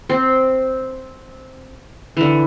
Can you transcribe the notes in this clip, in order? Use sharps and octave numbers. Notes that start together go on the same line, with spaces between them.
C4
D3 E3